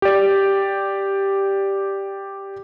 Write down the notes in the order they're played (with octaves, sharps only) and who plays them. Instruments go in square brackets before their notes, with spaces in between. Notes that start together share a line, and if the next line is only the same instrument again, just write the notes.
[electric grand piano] G4 D5